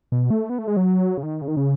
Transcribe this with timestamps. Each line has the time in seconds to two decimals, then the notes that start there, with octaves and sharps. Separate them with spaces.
0.12 B2
0.30 A3
0.50 B3
0.58 A3
0.67 G#3
0.77 F#3
1.17 C#3
1.23 D#3
1.42 C#3
1.48 D#3
1.57 C#3